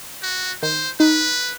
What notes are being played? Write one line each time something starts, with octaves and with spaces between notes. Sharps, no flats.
F#4
D#3 C5
D#4 B4